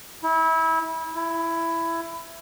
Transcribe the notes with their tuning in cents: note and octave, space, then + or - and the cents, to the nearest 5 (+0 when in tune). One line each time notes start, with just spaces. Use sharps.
E4 -25
E4 +15